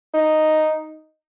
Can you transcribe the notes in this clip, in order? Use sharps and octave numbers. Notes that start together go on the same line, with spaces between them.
D#4